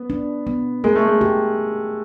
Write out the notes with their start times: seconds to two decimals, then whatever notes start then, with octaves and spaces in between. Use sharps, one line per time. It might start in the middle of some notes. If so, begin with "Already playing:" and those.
Already playing: B3
0.10 D4
0.47 B3
0.84 G#3 A#4
0.96 A3
1.07 G#3
1.21 G4